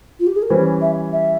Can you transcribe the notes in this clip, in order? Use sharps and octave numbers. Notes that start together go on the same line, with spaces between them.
F4
G4
G#4
A#4
E3 G3 C#4 C5
E5
E5